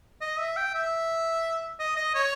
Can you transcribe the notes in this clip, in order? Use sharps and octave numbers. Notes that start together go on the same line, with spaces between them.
D#5
E5
G5
E5
D#5
D#5
C#5